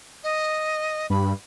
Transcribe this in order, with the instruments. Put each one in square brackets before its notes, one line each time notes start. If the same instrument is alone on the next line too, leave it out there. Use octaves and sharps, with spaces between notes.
[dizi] D#5
[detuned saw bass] G2 [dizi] B5